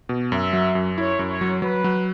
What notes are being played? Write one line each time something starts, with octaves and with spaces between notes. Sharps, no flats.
B2
F#2 E5
F#3
F#2
E4 C#5
F#2
C#5
F#3
F#3 B4
F#3